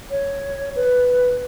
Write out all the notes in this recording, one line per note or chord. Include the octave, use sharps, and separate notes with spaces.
C#5
B4